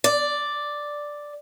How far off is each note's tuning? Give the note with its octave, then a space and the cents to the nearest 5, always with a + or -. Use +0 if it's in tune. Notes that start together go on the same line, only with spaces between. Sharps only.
D5 +0